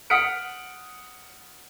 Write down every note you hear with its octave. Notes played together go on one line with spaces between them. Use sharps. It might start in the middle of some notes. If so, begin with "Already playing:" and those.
F#5 D#6 F6 B6 C#7 D7